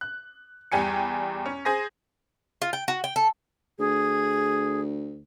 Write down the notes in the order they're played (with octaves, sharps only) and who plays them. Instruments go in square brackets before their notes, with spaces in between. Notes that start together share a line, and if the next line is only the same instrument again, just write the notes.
[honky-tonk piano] F#6
E2 G3 G4 G#5 C#7
C#4
G#4 C5 G#5 A#6
[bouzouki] F4
G5
F#4
G5
A4
[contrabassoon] D2 [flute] G#4